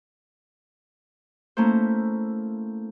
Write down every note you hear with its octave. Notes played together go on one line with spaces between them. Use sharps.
A3 A#3 C#4 E4 C5